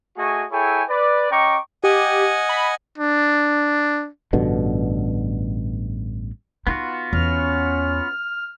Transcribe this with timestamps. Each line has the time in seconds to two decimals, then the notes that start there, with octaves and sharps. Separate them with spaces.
0.17 A3 F#4 G#4 D#5 G#5 C#6
0.52 E4 G#4 A4 C#5 G5 G#5
0.88 B4 D5
1.30 C#4 D#5 G5 A#5 C#6 D6
1.84 G4 D#5 F#5 G#5
2.49 B5
2.98 D4
4.33 A1 G2 B2 D3
6.67 B3 D#4 F4 F#4
7.13 E2 C#4 F6